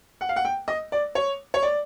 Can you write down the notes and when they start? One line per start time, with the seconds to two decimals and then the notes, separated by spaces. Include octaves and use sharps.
0.21 F#5
0.29 F5
0.36 F#5
0.45 G5
0.68 D#5
0.92 D5
1.15 C#5
1.54 C#5
1.63 D5